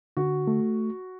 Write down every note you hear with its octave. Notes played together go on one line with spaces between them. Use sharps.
D3 F#4
A3